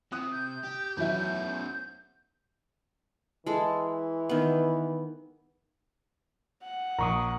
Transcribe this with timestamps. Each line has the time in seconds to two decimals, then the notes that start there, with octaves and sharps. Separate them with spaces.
0.12 C3 D#6 F#6
0.32 G6
0.64 G4
0.97 E2 F#3 B3 C#4 E5
3.46 E3 G#3 A4
4.29 D#3 B3
6.63 F#5
6.99 A#1 A#5 C#6 D#6